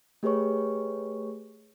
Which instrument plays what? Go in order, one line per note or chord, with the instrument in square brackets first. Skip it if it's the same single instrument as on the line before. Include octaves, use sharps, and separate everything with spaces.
[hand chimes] A3 G4 G#4 B4 C#5 C#6